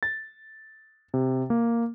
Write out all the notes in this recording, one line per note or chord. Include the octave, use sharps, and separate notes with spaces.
A6
C3
A#3